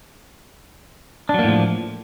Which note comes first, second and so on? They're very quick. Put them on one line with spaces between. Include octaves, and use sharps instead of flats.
D4 F#3 A#3 A2 F3